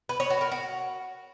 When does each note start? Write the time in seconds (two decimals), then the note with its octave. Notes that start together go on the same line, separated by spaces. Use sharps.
0.09 B4
0.20 C#5
0.30 F#4
0.41 A#4
0.51 F#4